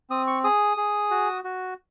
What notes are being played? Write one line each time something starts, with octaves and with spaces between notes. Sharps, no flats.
C4 D#6
C#6
G#4 D#6
G#4
F#4
F#4